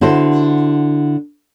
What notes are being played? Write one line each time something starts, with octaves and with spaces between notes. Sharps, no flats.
D3 E4 F#4 C5